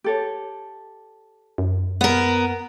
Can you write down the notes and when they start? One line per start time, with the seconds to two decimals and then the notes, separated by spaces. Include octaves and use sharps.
0.04 G4 A4 C#5
1.58 F#2
2.01 B3 A#4 F#5